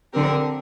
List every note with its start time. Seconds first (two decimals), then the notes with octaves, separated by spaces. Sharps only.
0.13 D3 F3 C4 G4 A#4